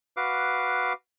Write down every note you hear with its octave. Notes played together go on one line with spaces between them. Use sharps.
F#4 B4 F5 D6